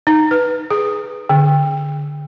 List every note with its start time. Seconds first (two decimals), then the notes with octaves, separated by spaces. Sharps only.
0.07 D#4
0.31 B4
0.71 G#4
1.29 D3